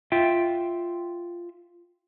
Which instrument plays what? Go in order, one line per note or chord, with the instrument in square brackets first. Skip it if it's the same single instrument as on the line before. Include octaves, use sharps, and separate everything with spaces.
[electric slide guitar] F4 E5 G5